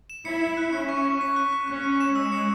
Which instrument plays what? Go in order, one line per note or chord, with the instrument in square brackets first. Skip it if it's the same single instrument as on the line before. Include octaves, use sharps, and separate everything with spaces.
[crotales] E7
[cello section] E4 [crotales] C#7
[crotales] C#7
F#6
[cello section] C#4 [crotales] C#7
[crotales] C#6
C#6
B6
F#6
F#6
[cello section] C#4 [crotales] F#6
[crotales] F#6
E7
[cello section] G#3 [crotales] E6
[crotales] C#7